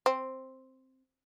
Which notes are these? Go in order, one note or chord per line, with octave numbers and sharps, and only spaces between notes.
C4